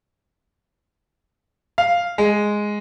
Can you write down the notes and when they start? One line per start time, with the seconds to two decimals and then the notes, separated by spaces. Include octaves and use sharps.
1.78 F5
2.18 G#3